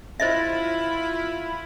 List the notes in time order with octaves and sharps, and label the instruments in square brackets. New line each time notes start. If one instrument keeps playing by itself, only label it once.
[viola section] E4 F4 B5 [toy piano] C5 D#5 E5